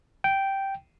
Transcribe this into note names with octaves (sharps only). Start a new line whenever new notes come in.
G5